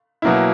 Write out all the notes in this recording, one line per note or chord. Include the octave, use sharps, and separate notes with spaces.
B2 F#3 A#3 E4